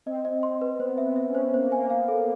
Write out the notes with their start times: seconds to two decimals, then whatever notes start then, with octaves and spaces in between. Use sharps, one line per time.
0.06 C4 D#5
0.25 D#5
0.43 C6
0.61 B4
0.79 B3 C5
0.98 E5
1.04 B3
1.16 E5
1.28 C#4
1.35 C5
1.53 A#3 C5
1.72 G#5
1.78 A#3
1.90 B3 F5
2.08 A4